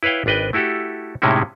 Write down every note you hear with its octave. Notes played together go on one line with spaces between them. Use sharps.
E4 B4 C#5 F5 G5
G#1 D4 B4 D#5 G5
A3 E4 F#4 G4 A4
A2 C3 G#3 C#4 D#4 E4